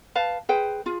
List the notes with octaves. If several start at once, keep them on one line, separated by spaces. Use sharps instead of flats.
B4 F5 A5
G#4 B4 C5 G5
F4 G#4